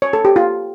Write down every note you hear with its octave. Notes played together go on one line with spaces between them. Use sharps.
C#5
A4
G4
F4